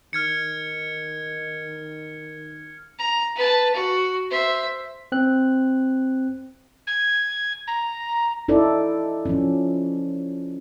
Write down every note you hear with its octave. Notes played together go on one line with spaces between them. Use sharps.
D#3 F6 G#6 C#7
A#5
B4 A5
F#4
C5 E5
C4 F#6
G#6
A#5
D#4 E4 A4 D5
F3 C#4